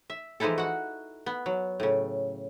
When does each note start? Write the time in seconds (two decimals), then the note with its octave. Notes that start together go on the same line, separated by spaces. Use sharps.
0.10 E5
0.40 E3 F3 G#3 D#4 E4 A4
0.58 F#4 F#5
1.26 B3
1.46 F#3
1.80 A2 C#3